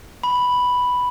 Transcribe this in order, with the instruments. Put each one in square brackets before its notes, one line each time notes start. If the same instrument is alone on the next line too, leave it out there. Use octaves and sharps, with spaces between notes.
[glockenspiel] B5